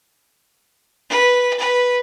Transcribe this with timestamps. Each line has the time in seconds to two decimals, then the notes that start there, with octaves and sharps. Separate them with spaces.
1.10 B4
1.59 B4